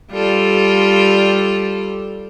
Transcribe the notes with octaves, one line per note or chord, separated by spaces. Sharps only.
G3 F4 A4